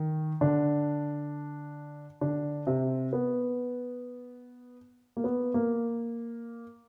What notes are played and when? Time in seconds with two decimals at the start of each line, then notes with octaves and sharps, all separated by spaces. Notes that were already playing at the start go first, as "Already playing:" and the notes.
Already playing: D#3 D#4
0.41 D3 D4
2.21 D3 D4
2.67 C3 C4
3.13 B3
5.17 A#3
5.24 B3
5.54 A#3